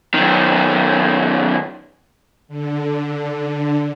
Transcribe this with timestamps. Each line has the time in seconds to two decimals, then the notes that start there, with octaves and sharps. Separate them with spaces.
0.14 F#2 D#3
2.48 D3